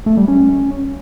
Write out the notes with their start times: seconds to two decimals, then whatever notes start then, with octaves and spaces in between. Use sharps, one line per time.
0.06 A3
0.17 G3
0.28 C#4